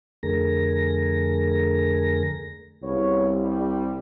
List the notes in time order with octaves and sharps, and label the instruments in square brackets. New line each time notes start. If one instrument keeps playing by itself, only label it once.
[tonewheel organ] F2 D3 A3 G#4 A#4 A#6
[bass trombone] C2 [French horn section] C#3 B3 C#5
[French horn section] G3